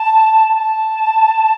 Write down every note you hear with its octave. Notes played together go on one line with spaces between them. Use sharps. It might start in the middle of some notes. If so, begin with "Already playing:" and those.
Already playing: A5
A5